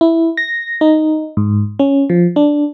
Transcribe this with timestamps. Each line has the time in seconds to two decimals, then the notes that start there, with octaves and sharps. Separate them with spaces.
0.01 E4
0.37 A#6
0.81 D#4
1.37 G#2
1.79 C#4
2.10 F3
2.36 D4